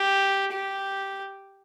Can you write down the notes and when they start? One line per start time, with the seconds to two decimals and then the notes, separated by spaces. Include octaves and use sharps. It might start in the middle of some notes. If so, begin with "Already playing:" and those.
Already playing: G4
0.52 G4